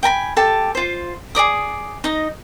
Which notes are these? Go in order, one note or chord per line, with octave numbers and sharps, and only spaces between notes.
G5 G#5 A#5 B5
G4 A4 G5 A5
F4 C5
G#4 A#4 D5 D#6
D#4 D#5